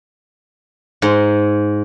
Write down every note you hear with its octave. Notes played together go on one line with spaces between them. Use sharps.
G#2